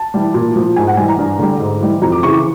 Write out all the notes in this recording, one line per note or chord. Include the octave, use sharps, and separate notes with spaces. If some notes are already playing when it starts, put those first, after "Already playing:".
Already playing: A5
E3 G3
A#2
F3
G#2 G#5
F#5
E3 G3 G#5
A#5
G2
D3 G3
G#2
E3 G3
F2 A#5
D6
C#3 E3 C#6
C#6